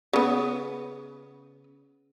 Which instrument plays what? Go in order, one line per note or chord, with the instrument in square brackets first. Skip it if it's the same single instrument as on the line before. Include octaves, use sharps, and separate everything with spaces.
[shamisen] C#3 B3